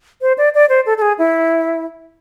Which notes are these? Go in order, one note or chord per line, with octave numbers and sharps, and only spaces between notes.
C5
D5
D5
C5
A4
A4
G#4
E4